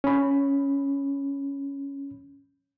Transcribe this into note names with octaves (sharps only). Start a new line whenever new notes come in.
C#4 B5